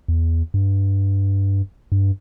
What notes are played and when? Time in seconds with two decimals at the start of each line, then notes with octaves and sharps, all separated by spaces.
0.08 E2
0.54 G2
1.92 G2